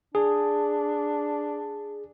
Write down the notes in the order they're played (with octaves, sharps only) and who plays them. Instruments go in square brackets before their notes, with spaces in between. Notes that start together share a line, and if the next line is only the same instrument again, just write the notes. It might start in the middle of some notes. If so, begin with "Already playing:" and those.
[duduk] D4 [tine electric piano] G#4